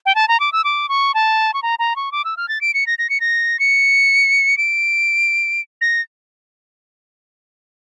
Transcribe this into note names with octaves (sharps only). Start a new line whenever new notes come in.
G5
A5
A#5
D6
E6
D6
C#6
A5
C#6
A#5
A#5
C#6
D6
E6
F6
A6
D7
C#7
A#6
A#6
C#7
A#6
C#7
D7
A#6